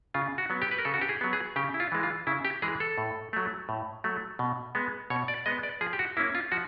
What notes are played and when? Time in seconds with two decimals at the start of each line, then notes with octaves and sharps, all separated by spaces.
0.14 C#3 F4
0.38 F#4
0.50 F#3 B3
0.62 G4
0.71 B4
0.78 A#4
0.85 C#3 A4
0.94 F#4
1.01 G4
1.09 G#4
1.21 F#3 B3
1.33 G#4
1.56 C#3 G4
1.74 E4
1.80 F4
1.92 E3 G#3
2.03 F4
2.27 C#3 E4
2.45 G4
2.62 E3 G#3 G#4
2.80 A4
2.98 A2
3.33 F#3 A3
3.69 A2
4.04 F#3 A3
4.39 B2
4.75 G#3 B3
5.10 B2 C#5
5.28 D5
5.46 G#3 B3 D#5
5.63 D5
5.81 F3 G#4
5.93 G4
5.99 F#4
6.17 A#3 E4
6.19 C#4
6.35 F4
6.52 F3 F#4